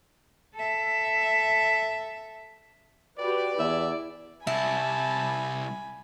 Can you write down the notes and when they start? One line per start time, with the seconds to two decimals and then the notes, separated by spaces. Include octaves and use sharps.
0.55 A4 E5
3.19 F#4 G4 B4 D5
3.59 E2 E4 E5
4.47 C2 E4 G#5 A5 B5